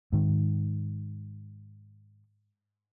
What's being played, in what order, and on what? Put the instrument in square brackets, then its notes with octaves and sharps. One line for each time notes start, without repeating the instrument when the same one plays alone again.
[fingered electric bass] G#2 D#3